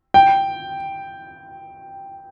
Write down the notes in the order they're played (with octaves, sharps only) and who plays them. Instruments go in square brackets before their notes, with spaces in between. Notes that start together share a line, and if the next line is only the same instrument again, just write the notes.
[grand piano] G5